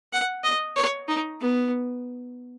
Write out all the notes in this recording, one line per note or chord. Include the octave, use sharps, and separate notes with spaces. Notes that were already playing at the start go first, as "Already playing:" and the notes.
F#5
D#5
C#5
D#4
B3